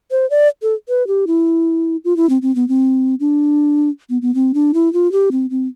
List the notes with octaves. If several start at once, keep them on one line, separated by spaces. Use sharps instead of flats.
C5
D5
A4
B4
G4
E4
F4
E4
C4
C4
B3
C4
D4
B3
B3
C4
D4
E4
F4
G4
C4
C4